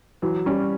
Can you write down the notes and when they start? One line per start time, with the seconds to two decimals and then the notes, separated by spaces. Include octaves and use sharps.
0.22 E3 F#3
0.46 G3 C#4